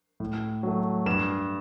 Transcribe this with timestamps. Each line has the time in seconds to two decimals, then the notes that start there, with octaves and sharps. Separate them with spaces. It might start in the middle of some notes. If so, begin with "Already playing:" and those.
0.20 A2
0.63 F#3 A3
1.06 G2 E7